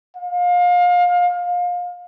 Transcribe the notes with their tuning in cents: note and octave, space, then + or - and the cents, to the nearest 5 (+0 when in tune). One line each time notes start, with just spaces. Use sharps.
F5 +30